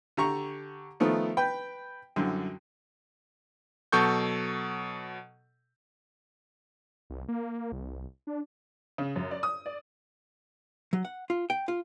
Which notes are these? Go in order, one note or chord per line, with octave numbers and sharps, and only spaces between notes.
D3 G4 A#5 C#6
D#3 F3 A3 B3
B4 G5
C2 F#2 D3
B2 F#3 A4 C#6 G6
C2
A#3
C2
D4
C#3
F#2
D5
D#6
D5
F#3
F#5
F4
G5
F4